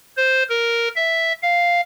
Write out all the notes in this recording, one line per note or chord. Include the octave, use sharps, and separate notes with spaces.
C5
A#4
E5
F5